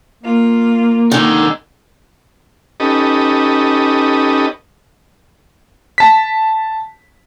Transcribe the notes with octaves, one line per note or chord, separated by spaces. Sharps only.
A#3 F4
D3 D#3 G#3
C#4 D#4 G4 A4 B4 D#5
A5 B6